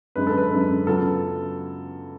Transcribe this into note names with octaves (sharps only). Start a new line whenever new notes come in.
F#2 D3 G#3 B4
A4
B4
F#2 D3 G#3
C#3 F#3 B3 F4 A4